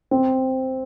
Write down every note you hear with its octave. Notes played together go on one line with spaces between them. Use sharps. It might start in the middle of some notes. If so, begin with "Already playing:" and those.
C4